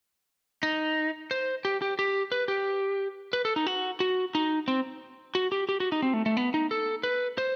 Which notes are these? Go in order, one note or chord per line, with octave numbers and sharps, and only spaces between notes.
D#4
C5
G4
G4
G4
B4
G4
B4
A4
D#4
F#4
F#4
D#4
C4
F#4
G4
G4
F#4
D#4
C4
A3
A3
B3
D#4
A4
B4
C5